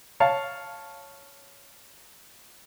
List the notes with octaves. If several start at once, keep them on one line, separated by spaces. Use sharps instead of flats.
C#5 F5 A5